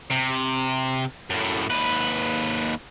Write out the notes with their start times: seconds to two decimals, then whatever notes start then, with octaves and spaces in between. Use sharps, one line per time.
0.11 C3
1.30 F#2 A2
1.70 D#2 B4